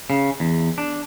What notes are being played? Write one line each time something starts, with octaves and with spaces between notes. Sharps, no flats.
C#3
E2
D4